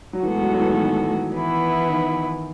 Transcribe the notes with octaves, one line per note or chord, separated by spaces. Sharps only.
F#3
A2 E3 G#3 B3 F#4 A4
F#3
F#3
E3
E3
D#3
E3 B3 E4
D#3